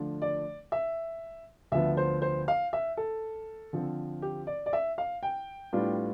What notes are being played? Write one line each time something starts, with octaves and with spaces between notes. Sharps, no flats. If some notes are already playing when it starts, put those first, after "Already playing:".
Already playing: D3 F3 A3 D4 F4
D5
E5
D2 D3 F3 B3 E5
C5
C5
F5
E5
A4
D3 F3 C4
G4
D5
D5
E5
F5
G5
A2 G3 B3 D4 F4